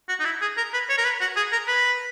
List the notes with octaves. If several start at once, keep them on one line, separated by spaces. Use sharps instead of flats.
F#4
D#4
E4
G#4
A#4
B4
C#5
A#4
B4
F#4
G#4
A#4
B4